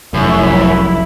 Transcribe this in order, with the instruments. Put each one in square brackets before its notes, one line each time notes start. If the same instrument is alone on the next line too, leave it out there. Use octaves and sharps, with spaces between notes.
[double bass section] F1 C2 [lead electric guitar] F#2 [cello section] E4